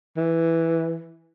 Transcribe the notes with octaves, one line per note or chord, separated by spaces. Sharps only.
E3